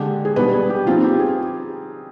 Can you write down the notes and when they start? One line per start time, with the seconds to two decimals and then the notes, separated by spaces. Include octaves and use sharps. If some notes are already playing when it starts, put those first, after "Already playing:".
Already playing: D3 G#3 D4 G4
0.25 G#4
0.36 B2 G3 B3 D4 B4
0.53 G#4
0.69 G4
0.86 F3 C4 D#4 F4
1.04 G4
1.20 G#4